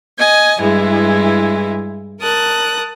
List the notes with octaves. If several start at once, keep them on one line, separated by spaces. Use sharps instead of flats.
D#5 G#5
G2 E3 G#3 E4
A#4 A5 D#6 F#6